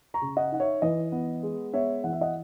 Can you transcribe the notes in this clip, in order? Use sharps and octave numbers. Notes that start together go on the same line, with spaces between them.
A#5 C#6
C#3
D#5 F#5
D#4 F#5
C#5 E5
E3 B4 D#5
B3
G#3
B3 C#5 E5
E3 F#5
E5
D#5 F#5